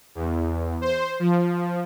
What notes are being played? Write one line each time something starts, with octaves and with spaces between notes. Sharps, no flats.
E2
C5
F3